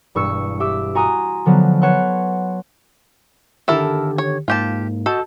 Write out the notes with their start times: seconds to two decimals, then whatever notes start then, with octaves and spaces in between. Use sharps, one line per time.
0.15 E1 G2 C#6 E6 C#7
0.60 G4 E5 D6 E6
0.95 F#4 G#5 A#5 C6 D#6
1.46 D3 F3 F#3 B3
1.82 B4 C#5 F#5 A5 C6 F#6
3.68 D3 D#3 E4 G4 A4 A#4
4.18 C#5
4.48 G#2 A#3 F4 G4 A5
5.06 F#4 A4 D#5 G6